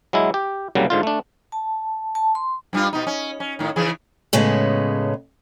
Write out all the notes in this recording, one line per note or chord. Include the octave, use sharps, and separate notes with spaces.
F#3 G#3 E4
G4
C2 C#3 F#3 G3 A#3
G#2 D3 F4
A3 D4
A5
A5
C6
G2 G3 F4
B2 D#4
C#4
C#4
A2 D#3
C#3 E3 G#4
A2 C#3 G#3 B3